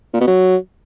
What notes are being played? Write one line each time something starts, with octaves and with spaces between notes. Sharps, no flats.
A#2
B2
F#3